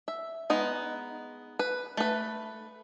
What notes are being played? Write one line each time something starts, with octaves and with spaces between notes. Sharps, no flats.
E5
G#3 B3 D#4
B4
A3 B4